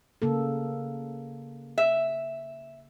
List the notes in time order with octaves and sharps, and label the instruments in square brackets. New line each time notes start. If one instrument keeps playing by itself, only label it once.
[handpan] C#3 A#3 A4
[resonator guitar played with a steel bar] E5